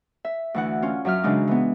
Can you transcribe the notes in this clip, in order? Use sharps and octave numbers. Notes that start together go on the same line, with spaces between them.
E5
D2 E3 F#5
C#4 F4
F#2 F#3 E5 F6
C#3 E3 G#3 D4 D#4
E3 B3